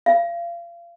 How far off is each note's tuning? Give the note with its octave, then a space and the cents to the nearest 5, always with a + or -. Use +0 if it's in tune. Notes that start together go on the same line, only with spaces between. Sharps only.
F5 -35